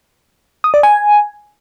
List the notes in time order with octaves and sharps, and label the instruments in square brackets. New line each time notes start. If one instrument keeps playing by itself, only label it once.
[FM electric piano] D#6
D5
G#5